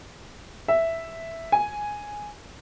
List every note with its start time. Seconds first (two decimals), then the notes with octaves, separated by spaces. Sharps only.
0.68 E5
1.52 G#5